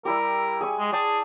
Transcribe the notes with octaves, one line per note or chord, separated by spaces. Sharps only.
G3 E4 G4 A#4
G#4 G#5 C#6
G#3
G#4 D5 G5 A5